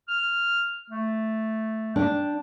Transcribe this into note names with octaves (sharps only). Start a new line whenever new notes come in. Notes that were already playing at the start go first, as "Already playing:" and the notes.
F6
A3
D4 G5